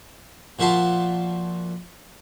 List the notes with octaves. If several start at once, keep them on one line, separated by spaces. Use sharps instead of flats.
A#2 F3 F#4 E5 A5 C6